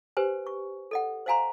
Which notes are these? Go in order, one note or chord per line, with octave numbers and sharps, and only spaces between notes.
G4 B4 C5 G#5
C#6
A4 D#5 F#5
C5 D#5 F5 G#5 A#5 C6